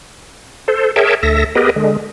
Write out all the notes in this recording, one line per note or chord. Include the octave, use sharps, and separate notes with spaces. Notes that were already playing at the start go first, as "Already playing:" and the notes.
A4 C5
G#4 A#4 C#5 E5 G5 A5
D2 A4 E5 A#6
B3 G4 G#4 A#4 B4 D#5
D3 G#3